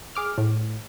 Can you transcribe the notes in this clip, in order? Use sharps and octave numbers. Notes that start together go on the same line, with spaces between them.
G#4 D6 F6
A2